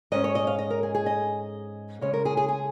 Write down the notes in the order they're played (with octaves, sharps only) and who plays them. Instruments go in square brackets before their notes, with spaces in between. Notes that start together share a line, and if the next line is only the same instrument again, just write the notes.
[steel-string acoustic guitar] G#2 G#3 C#4 D#5
C#5
D#5
F5
D#5
A#4
G#4
G#4
D#5
C#3 G#3 C#4 C#5
A#4
G#4
G#4
G#4